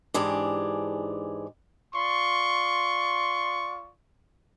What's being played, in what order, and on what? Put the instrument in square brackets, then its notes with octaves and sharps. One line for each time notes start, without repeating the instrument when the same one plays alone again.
[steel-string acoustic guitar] G#2 E3 D4 G4 G#4
[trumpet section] F4 D5 C6 C#6